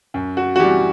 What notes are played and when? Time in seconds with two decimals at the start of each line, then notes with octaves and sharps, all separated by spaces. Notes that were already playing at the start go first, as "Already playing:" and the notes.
0.14 F#2
0.37 F#4
0.56 F#4
0.59 E3 G4
0.64 G3